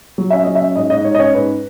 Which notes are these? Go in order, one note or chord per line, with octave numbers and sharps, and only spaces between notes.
F#3
C#4 E5
F#3 D#5
E5
C#4
G#2 D#5
G#2 D#5
G#2 C#5
D#5
C#4 C#5
G#2 B4